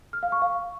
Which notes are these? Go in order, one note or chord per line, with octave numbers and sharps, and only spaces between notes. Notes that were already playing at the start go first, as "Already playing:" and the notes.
F6
F5
C#6
F5